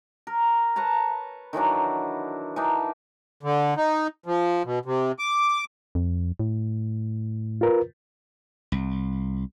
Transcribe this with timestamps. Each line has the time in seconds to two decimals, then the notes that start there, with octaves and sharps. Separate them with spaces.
0.27 A#4
0.76 B4 C#5 A5 A#5
1.53 D#3 E3 F#3 D4
2.56 E3 D4 D#4
3.43 D3
3.77 D#4
4.26 F3
4.65 B2
4.85 C3
5.19 D6
5.95 F2
6.40 A2
7.61 F4 A#4 B4
8.72 C2